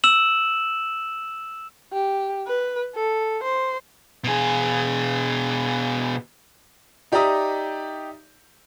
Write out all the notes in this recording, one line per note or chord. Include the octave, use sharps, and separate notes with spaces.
E6 E7 F#7
G4
B4
A4
C5
B2 G#4
D#4 G4 D5 E5 A#5 D#6